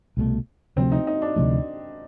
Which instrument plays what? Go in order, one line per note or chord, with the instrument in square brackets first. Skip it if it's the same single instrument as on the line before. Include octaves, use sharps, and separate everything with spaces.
[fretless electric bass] C2 B2 F#3 A3
[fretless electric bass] D2 C3 F3 A3 [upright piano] C4
[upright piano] D#4
D#4
D4
[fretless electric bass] D2 C3 F3 A3